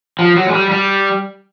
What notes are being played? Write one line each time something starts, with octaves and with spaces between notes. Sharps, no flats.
F3
F#3
G#3
G3
G3